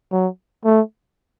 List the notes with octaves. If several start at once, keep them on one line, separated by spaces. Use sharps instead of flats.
F#3
A3